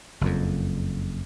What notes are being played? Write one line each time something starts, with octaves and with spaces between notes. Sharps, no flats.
F#1 F2